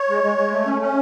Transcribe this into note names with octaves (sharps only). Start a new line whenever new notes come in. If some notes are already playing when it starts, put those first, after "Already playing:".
Already playing: C#5
G#3
G#3
G#3
A3
C#4
C#4